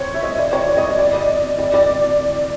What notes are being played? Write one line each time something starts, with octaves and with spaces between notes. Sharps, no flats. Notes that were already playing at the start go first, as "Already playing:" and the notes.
Already playing: C5 C#5
E5
D#5
D5
C#5
D5
D#5
D#5
D5
D#5
D5
D5